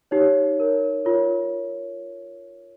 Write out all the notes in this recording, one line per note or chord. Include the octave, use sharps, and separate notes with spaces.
D#4 G4 C#5
D#4 A#4 C#5
F4 A#4 C#5